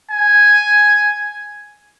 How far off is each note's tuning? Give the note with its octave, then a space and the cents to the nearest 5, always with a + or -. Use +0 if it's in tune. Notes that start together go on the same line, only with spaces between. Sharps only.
G#5 +0